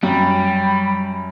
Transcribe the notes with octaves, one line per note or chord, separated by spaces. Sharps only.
F#2 G3 G5 B5